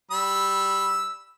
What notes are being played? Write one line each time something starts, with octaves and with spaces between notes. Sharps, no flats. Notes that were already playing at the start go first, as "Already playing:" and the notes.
G3 B5 E6